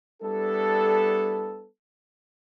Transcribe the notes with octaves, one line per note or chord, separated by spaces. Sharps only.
G3 B3 D4 E4 A4